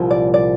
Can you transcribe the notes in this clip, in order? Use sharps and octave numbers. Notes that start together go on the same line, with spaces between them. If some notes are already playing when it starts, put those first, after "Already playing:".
Already playing: C2 A#2 F3 A#3
D5
D5